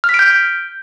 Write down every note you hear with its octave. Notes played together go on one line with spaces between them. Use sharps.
F6
B6
D7
G6